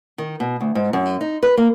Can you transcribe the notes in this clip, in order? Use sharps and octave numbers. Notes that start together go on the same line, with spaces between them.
D#3
B2
D2
G#2
F#2
D#4
B4
A#3